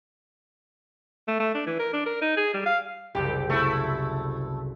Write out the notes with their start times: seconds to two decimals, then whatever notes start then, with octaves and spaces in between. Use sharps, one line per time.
1.28 A3
1.40 A3
1.54 D4
1.66 E3
1.79 A#4
1.93 D4
2.06 A#4
2.22 D#4
2.37 G#4
2.54 G3
2.66 F5
3.15 F#1 C2 G4
3.50 A3 E4